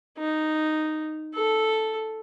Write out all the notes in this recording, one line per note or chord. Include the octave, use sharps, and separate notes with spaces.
D#4
A4